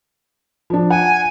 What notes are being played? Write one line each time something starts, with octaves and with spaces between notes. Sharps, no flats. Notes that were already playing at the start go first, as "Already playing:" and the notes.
F3 D4
F#5 G#5